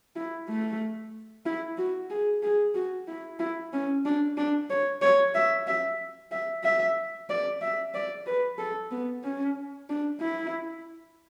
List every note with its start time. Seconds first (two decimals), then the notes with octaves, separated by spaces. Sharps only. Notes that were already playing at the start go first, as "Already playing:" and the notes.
0.16 E4
0.49 A3
1.46 E4
1.78 F#4
2.10 G#4
2.43 G#4
2.75 F#4
3.08 E4
3.40 E4
3.73 C#4
4.05 D4
4.37 D4
4.70 C#5
5.02 C#5
5.35 E5
5.67 E5
6.32 E5
6.64 E5
7.30 D5
7.62 E5
7.94 D5
8.26 B4
8.59 A4
8.91 B3
9.24 C#4
9.90 D4
10.21 E4